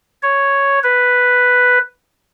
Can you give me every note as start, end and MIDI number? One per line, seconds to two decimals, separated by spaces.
0.23 0.79 73
0.83 1.78 71